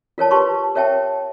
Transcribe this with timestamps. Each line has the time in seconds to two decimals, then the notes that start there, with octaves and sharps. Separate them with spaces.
0.18 F4 A#4 C#5 A5
0.31 F4 G4 B4 A5 C6 C#6
0.75 A#4 C#5 E5 G5 A5